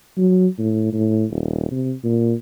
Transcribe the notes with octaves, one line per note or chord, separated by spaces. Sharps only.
F#3
A2
A2
D#1
C3
A#2